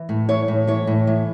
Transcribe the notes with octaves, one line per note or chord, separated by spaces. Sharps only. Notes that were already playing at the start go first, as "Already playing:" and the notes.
Already playing: E3
A2
E3 C#5
A2
E3 C#5
A2
E3